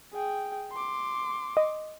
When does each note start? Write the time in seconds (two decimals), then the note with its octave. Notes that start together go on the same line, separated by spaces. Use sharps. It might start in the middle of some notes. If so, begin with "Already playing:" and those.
0.13 G#4 G5
0.72 C6 D6
1.57 D#5